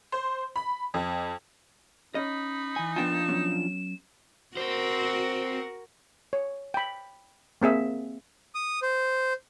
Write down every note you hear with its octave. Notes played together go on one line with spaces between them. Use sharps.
C5
B5
F2
C#4 D#4 D#5 B5
E3 G#5
F3 B3 D4 F4 G5 G#5 E7
F#3 B3 C#4
C4 F#4 A#4 C5
C#5
G5 B5
A#3 C4 G#4 E5
D#6
C5